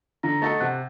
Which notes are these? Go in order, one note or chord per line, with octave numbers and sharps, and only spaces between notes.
D3 A#5 A#6
A3 D#4 F#4 A4 A5 A6
C3 F#5 F#6